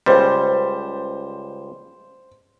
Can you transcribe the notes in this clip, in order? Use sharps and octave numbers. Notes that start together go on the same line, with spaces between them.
C#2 G3 C5